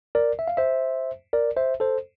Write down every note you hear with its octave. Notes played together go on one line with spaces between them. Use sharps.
A#4 D5
E5
F5
C5 E5
A#4 D5
C5 E5
A4 C5